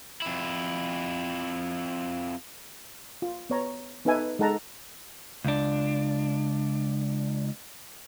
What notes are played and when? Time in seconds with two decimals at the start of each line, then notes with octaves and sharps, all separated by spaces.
0.22 F2 E4
3.22 F4
3.50 B3 C#5 A#5
4.05 B3 D#4 A4 B4 E5 G#5
4.39 G#3 D#4 A4 F#5 A5 A#5
5.45 C#2 D4